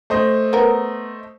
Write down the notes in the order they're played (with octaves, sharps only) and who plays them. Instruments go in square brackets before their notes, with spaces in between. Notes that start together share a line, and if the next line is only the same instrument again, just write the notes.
[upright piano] A3 C5 D#5
[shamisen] B3 A#4